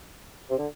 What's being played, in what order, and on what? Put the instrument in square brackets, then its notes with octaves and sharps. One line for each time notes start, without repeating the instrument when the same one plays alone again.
[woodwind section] C3
D3